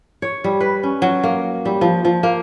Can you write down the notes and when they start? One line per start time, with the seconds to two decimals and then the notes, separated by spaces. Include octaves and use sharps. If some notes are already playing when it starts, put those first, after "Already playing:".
0.22 C#5
0.44 G3
0.61 B4
0.83 C#4
1.02 F#3
1.24 A#3
1.65 G3
1.81 F3
2.05 F3
2.23 A#3